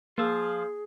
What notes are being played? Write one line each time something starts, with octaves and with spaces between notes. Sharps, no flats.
F3 A#3 F4 G#4 E6